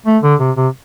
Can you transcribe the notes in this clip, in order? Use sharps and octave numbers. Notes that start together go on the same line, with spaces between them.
A3
D3
C3
C3